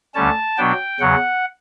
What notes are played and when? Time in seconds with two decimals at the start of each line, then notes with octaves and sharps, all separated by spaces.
0.14 D2 D3 G3 C#4 A5
0.57 B2 F#3 B3 D4 G5
1.00 E2 C#3 F#3 F#5